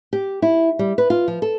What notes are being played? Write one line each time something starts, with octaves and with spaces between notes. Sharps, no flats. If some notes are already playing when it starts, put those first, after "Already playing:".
G4
E4
G3
B4
F4
F3
A4